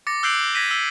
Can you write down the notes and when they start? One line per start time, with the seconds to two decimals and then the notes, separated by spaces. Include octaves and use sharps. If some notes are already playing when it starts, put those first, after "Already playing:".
0.07 D6 A6 A#6 C#7
0.23 E6 F#6 G6 C7 D7 F#7
0.55 G#6 A#6 B6 D#7
0.71 E6 F#7